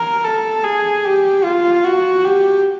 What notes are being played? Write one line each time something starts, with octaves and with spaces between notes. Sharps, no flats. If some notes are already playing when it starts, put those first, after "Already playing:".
Already playing: A#4
A4
G#4
G4
F4
F#4
G4